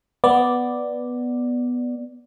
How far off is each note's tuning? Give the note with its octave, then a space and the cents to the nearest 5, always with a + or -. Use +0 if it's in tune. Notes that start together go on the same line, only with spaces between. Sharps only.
B3 +0 D5 +0